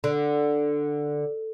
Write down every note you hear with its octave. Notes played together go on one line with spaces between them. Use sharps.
D3